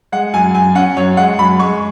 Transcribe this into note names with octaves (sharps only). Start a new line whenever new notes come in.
G#3 F#5
F#2 G#5
F#2 G#5
C#4 F#5
F#2 C#5
G#3 F#5
F#2 B5
G#3 C#6